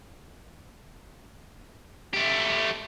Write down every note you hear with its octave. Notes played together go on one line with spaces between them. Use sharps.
A3 G4